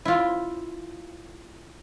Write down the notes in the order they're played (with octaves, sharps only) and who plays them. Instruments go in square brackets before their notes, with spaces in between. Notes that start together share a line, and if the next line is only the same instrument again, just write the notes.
[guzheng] E4 F4